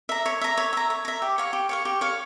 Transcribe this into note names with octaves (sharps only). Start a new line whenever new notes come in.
E5 A#5
C#5
E5 A#5
C#5
E5 A#5
C#5
E5 A#5
G4
C#5 F5 C#6
G4
C#5 F5 C#6
G4
C#5 F5 C#6